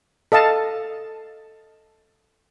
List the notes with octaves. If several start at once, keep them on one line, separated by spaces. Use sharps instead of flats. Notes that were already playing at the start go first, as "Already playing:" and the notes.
A4 D#5 F5 A5